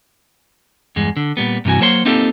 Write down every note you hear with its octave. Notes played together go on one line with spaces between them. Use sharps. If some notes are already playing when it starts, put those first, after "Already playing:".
E2 G2 G#3
D3
A#2 G3 B3
G2 C3 E3 F#4 G#5
F#3 A#3 C5 C#5 E5 C6
A#3 C4 D#4 F4 G4 A4